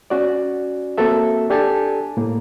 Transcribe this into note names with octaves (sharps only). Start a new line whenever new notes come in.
C#4 F#4 D5
A#3 C4 F#4 A4 E5
D4 G4 A4 G#5 A5
A2 A#3